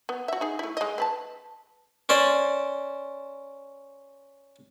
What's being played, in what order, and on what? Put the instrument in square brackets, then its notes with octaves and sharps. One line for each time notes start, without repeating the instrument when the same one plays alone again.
[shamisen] B3
F#4 E5
D#4 G#4
A3 E4
G#3 D#5
C4 B4 A5
[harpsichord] C#4 C5 D5